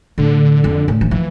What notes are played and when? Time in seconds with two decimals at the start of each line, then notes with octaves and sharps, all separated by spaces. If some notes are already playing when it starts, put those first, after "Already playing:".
0.18 A2 D3
0.64 F2
0.88 A2
1.01 E3
1.11 E3 F3